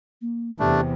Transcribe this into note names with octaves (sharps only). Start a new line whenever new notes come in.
A#3
E2 C3 A3 D4 G4